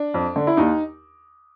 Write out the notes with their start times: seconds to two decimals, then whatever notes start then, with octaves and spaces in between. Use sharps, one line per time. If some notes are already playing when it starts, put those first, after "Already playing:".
Already playing: D4
0.14 F2
0.36 D3
0.47 E4
0.57 D#2 D#4